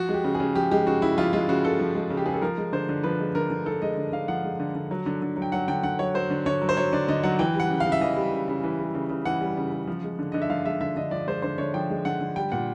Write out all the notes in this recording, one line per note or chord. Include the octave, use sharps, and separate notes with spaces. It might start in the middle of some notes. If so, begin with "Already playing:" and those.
Already playing: F3 F#4
G#3
G4
C#3
G#4
C#3
F3 G4
G#3 G4
C#3 F#4
C#3 E4
F3 F4
G#3 F4
C#3 F#4
C#3 A4
F3
G#3
C#3
G4
C#3 G#4
A4
F3 A#4
G#3
D3 C5
D3
F3 B4
G#3
D3 A#4
D3
F3 A4
G#3 D#5
D3
D3 F5
F3 F#5
G#3
D3
D3
F#3
D3
D3
F#3
G5
F#3 F#5
D3 G5
D3 F#5
F#3 C#5
F#3 C5
D3
D3 C#5
F#3
C5
F#3 C#5
D3 D5
D3 D#5
F#3 F#5
E3 G5
G3 F#5
C#3
F5
C#3
E5
E3 D#5
G3
C#3
C#3
E3
G3
C#3
C#3
E3 F#5
G3
C#3
C#3
F3
G#3
D3
D3 D#5
E5
F3 F5
G#3 E5
D3 E5
D3 D#5
F3 D5
G#3 C5
D3 C5
D3 C#5
F3 G5
G#3
D3 F#5
D3
G3 G5
A#2 F#5